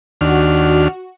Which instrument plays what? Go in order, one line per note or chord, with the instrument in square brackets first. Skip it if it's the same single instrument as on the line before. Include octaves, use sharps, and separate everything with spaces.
[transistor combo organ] D#2 D4 F6 [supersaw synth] F#4